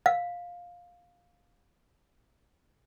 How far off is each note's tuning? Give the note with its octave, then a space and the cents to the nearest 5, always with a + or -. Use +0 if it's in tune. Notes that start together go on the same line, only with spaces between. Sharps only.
F5 +10